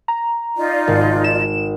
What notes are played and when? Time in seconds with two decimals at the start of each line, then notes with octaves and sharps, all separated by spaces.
0.08 A#5
0.56 D#4 F4 D5
0.87 G#1
1.24 E7